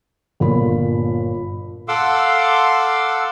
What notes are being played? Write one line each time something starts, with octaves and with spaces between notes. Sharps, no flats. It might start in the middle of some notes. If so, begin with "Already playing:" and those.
G1 A#2 F4 B5
A4 F5 F#5 C6 D6 E6